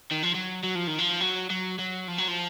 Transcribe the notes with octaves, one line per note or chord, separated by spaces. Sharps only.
D#3
F3
F#3
F#3
F3
D#3
F3
F#3
F#3
F#3
F3
F#3
F3